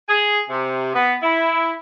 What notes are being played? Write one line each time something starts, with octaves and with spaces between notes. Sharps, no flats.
G#4
C3
B3
E4